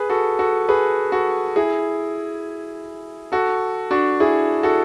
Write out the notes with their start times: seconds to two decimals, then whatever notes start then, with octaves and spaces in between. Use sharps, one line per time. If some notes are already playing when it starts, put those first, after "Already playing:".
Already playing: G#4 B4
0.10 F#4 A4
0.39 F#4 A4
0.69 G#4 B4
1.12 F#4 A4
1.56 E4 G#4
3.32 F#4 A4
3.91 D4 F#4
4.20 E4 G#4
4.63 F#4 A4